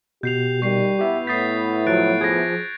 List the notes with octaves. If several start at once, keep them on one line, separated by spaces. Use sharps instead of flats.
B2 G4 G6 C7 F7
D#3 G3 C#6 C7
B3 E4 G4 E5
A2 D#6 G6 A6 B6 C7
F3 F#3 F4 F#6 A6 D7
F3 G#4 G#6 A#6